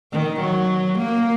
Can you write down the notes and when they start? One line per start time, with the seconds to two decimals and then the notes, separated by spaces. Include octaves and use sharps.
0.12 D#3
0.40 F#3
0.98 A#3